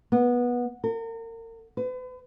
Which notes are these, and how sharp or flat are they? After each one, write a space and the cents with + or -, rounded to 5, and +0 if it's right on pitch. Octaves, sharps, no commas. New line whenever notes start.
B3 -20
A#4 -40
B4 +40